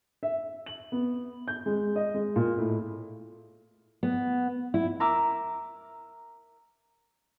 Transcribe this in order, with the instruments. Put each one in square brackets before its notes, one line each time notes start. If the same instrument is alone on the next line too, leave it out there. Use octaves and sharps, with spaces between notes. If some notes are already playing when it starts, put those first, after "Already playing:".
[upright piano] E5
F#7
B3
G6
G#3
D#5
G#3
A#2
A2
[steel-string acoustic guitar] B3
E4
[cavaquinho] A#4 E5 A#5 D6